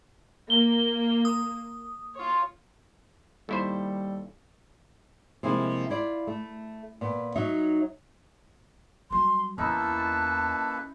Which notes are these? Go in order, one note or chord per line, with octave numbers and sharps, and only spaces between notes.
A#3 G7
D#6
F4 C#5
D#2 G3 E4 A4 C5
C3 F3 G#3 A#3 E4
E4 F4 D5
A3
A#2 B3
F#3 D#4 C#5 E5
F#3 G3 C6
E2 A#3 C#4 D#4 E4 A4 B4 A5